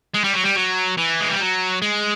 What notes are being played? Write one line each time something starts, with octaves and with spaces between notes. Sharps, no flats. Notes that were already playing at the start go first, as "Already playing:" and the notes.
G#3
G3
F#3
G3
F#3
E3
G#3
G3
F#3
G#3